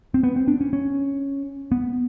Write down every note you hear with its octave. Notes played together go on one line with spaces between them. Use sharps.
C4
B3
C4
D4
C#4
C#4
B3